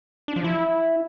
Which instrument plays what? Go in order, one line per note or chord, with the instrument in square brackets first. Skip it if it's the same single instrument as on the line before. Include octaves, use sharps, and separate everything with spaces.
[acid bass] D4
F3
E4